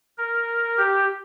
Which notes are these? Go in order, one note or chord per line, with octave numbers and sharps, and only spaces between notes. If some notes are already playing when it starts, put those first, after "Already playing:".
A#4
G4